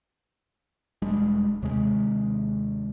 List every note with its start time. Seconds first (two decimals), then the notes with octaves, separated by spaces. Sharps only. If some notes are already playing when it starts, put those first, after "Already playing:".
1.02 E1 G3 G#3 D4
1.62 D#2 C3 G#3